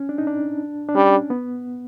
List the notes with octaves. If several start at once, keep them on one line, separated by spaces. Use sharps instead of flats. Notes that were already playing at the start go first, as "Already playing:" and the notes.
Already playing: C#4
D4
D#4
D4
D4
G3 C#4
B3